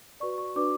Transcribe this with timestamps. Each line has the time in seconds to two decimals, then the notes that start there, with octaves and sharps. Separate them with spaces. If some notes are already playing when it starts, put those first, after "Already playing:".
0.20 F#4 B4 D5 C#6
0.38 C#6
0.55 D4 F#4 B4 D5 D6